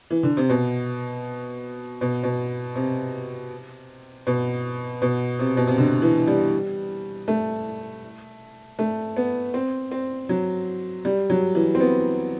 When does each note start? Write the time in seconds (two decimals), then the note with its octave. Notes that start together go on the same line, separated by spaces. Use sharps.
0.10 E3
0.23 D3
0.37 C3
0.50 B2
2.01 B2
2.23 B2
2.76 C3
4.27 B2
5.02 B2
5.39 C3
5.57 B2
5.67 C3
5.78 D3
6.02 E3
6.27 G3
7.28 A3
8.79 A3
9.17 B3
9.54 C4
9.91 C4
10.29 F#3
11.05 G3
11.30 F#3
11.55 E3
11.75 C4
11.80 B3